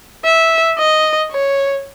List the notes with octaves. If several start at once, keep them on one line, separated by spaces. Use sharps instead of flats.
E5
D#5
C#5